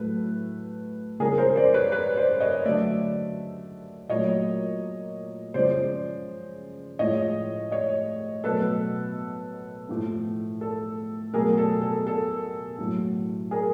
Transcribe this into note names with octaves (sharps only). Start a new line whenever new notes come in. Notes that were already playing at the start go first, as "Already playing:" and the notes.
Already playing: A2 F#3 A3 A4 B4
C#3 F3 G#3 G#4 A#4
A#4 C5
C5 D5
B4 C#5
B4 C#5
C5 D5
C#5 D#5
D3 F#3 A3 D5 E5
A#2 F#3 A3 C#5 D#5
C#3 F3 G#3 C5 D5
A2 F3 G#3 C#5 D#5
C#5 D#5
B2 F#3 A3 A4 B4
A2 F3 A3
A4
B2 F#3 A3 G#4 A#4
A4
A4
A4
A2 F#3 A3
G#4 A#4